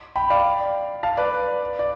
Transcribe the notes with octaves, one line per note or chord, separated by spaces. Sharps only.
G5 B5
D5 F5
F5 A5
B4 D5
D5